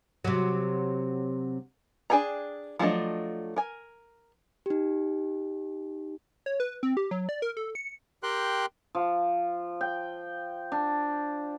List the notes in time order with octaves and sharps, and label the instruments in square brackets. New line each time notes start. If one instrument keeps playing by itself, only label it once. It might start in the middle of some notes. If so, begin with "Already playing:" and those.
[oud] C3 F#3
[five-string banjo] D4 G#4 G5 G#5 A#5
F3 F#3 A3 D4 D#5
A#4 G#5
[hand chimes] D#4 G4
[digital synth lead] C#5
B4
C4
G4
F#3
D5
A#4
A4
C#7
[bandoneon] G4 A#4 G5 C6 F#6
[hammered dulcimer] F3
G5
D4